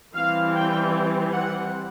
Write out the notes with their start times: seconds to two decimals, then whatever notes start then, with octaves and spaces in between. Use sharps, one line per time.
0.14 E3 G3 C4 F5
0.54 G5
1.33 F#5